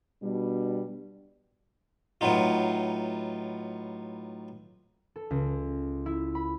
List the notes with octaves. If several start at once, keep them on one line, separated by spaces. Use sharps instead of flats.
B2 G3 D4
A2 F#3 B3 D#4 F4
A4
C#2
E4
B5